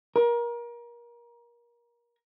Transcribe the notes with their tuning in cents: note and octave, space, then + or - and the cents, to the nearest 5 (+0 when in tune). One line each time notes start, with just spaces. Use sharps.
A#4 +30